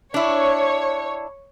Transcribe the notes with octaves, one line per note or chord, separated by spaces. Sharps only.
D4 E4 C#5